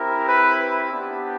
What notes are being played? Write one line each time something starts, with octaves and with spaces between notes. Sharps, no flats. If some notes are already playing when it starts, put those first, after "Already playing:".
Already playing: C4 E4 G4 A#4
B4
B3 D4 G4